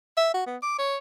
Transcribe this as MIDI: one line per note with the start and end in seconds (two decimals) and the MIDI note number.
0.17 0.32 76
0.34 0.45 66
0.47 0.57 59
0.62 0.74 86
0.79 0.98 73